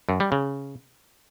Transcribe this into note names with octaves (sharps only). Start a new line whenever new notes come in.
F#2
G3
C#3